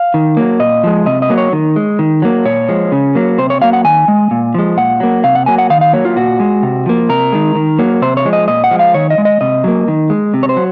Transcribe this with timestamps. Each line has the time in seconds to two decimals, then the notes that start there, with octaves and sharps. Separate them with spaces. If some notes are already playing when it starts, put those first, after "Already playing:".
Already playing: F5
0.14 D#3
0.37 F#3 A#3
0.60 A#2 D#5
0.84 F3 G#3
1.06 C3 D#5
1.22 D#5
1.30 F#3 A#3
1.38 C#5
1.53 D#3
1.76 G#3
1.99 D#3
2.22 F#3 A#3
2.45 A#2 C#5
2.69 F3 G#3
2.92 C#3
3.15 F#3 A#3
3.38 C3 C5
3.50 C#5
3.61 F#3 A#3 F5
3.73 F#5
3.85 D#3 G#5
4.08 G#3
4.31 A#2
4.54 F3 G#3
4.77 A#2 F#5
5.00 F#3 A#3
5.24 C3 F5
5.35 F#5
5.46 F#3 A#3 G#5
5.58 F#5
5.70 D#3 F5
5.81 F5
5.93 F#3 A#3 C#5
6.05 F4
6.16 A#2 F#4
6.40 G#3
6.63 C3
6.86 F3 A#3
7.09 C3 A#4
7.32 D#3 G#3
7.55 D#3
7.79 F#3 A#3
8.02 C3 C5
8.17 C#5
8.25 F3 G#3
8.33 D#5
8.48 A#2 D#5
8.64 F#5
8.71 F3 G#3
8.79 F5
8.94 D#3 C#5
9.10 D#5
9.18 G#3
9.25 D#5
9.41 C3 D#5
9.64 F#3 A#3
9.88 D#3
10.10 G#3
10.34 C3
10.43 C#5
10.49 C5
10.57 F#3